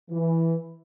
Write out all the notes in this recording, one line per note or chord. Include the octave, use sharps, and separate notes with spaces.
E3